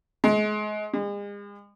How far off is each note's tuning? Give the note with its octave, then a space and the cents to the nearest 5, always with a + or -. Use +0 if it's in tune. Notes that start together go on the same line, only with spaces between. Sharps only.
G#3 +30
G#3 -40